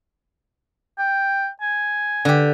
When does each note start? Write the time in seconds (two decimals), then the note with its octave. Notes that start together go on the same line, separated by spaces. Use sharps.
0.98 G5
1.61 G#5
2.25 D3 G4